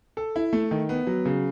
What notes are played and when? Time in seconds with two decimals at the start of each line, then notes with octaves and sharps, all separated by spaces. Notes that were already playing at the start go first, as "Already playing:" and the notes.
0.17 A4
0.36 E4
0.53 A3
0.71 D#3
0.89 B3
1.07 F#3
1.25 C#3